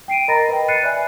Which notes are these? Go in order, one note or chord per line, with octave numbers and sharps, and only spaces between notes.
G5 C7 D7 D#7
A#4 D#5 A#5 B5 A6 A#6
B4 D#5 G5
B5 F#6 A6 C7 C#7 D#7
D5 E5 G#5